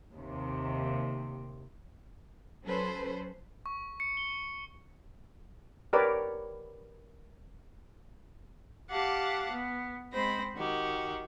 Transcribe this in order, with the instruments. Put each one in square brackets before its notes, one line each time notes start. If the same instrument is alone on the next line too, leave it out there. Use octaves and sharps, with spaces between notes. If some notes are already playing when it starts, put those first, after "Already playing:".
[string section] D#2 C3
[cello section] F#3 C#4 A4 B4 C5
[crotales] C#6
C#7
G7
[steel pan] G4 A#4 B4 C#5 D5
[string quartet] G4 F5 F#5 A5 D6
B3
G#3 C4 C5 B5 A#6
D#3 F#4 G4